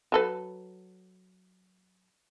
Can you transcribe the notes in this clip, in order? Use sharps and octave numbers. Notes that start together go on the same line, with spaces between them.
F#3 A4 B4